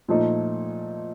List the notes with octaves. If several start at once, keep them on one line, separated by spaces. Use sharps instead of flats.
A#2 F3 A3 D#4